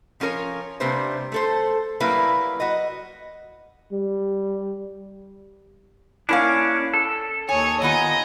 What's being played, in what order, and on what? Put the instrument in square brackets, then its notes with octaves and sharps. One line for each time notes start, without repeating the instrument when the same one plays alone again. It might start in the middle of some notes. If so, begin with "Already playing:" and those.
[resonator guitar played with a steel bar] F3 C#4 F4 A#4 C#5
C3 G3 A#3 D4 B4 C5
A3 A4 C5
F#3 G3 A#3 E4 A#4 B4
F#4 B4 D#5
[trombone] G3
[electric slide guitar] A#3 C#4 D4 [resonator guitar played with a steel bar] E4 A#4 F5
[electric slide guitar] A4
[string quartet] D#2 C#5 D#6 [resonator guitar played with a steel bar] G#5
[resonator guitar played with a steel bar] D#3 B3 F4 [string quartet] D#5 G#5 A#5